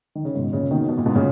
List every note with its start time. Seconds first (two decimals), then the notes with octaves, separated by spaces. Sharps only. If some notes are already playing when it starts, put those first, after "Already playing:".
0.15 D#3
0.25 C#3
0.35 G#2 B2
0.53 A#2 C#3
0.71 B2 D#3
0.88 B2
0.98 A#2
1.06 G#2 B2
1.15 A#2 C#3